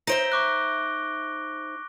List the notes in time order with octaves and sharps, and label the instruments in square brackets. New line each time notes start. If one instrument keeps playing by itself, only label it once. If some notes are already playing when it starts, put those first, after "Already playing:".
[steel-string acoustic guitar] D#4 C5 E5 [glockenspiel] A#6 D7 G7
[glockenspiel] C#6 D6 F#6